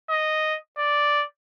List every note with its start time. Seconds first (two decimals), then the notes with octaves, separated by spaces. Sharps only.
0.10 D#5
0.78 D5